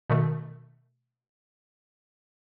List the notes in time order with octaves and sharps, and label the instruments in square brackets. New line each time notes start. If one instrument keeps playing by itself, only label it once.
[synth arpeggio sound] B2 D#3 A3